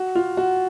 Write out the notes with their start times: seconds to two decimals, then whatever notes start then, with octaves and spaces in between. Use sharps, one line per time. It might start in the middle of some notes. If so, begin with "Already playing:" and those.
Already playing: F#4
0.15 F4
0.37 F#4